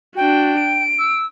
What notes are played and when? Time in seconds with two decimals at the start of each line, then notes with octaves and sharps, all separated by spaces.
0.16 D4 F#4 G5
0.59 D7
0.98 E6